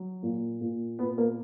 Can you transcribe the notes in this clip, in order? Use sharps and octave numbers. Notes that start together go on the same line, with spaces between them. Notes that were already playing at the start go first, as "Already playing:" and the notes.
Already playing: F#3
A#2
A#2
A#2 B3
A#3